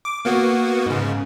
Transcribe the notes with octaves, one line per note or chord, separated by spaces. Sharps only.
D6
A#3 B3 F#4
G#2 C#3